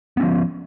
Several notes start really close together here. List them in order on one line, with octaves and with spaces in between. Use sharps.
B3 C#4 F3